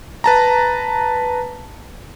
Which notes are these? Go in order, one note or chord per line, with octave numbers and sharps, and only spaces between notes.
B4 A5 A#5